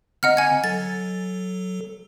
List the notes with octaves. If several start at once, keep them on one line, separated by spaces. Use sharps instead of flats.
D3 C4 D#5 F#5 A#5 F6
G#5 G#6
F#3 A4 A6